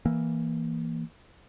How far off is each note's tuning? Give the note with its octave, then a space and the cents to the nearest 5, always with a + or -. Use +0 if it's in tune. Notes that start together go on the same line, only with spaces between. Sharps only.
E3 +0 A#3 +0